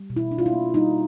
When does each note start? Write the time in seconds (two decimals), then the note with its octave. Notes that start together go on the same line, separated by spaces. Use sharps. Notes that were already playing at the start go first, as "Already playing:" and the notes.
Already playing: G3
0.10 B2
0.16 E4
0.31 D4
0.39 F4
0.46 E4
0.53 A#3
0.74 G3 D#4